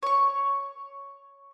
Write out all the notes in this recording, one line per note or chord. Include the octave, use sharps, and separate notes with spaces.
C#5 C#6